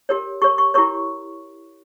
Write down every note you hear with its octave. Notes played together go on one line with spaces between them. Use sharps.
G4 A#4 C#5
G4 A#4 C#5 C#6
C#6
E4 G4 A#4 C#5 C#6